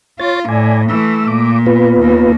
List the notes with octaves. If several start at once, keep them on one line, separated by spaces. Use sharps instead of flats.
F4 C#5 A6
A2 D5 G#5
E3 A3 E6
A#2 D6
B3 F4 B4
D#2 A#3